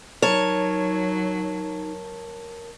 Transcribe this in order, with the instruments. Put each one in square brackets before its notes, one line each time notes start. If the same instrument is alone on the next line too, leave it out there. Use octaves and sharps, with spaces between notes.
[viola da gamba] F#3 [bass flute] D#4 [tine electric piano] A#4 A5 [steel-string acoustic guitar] C#5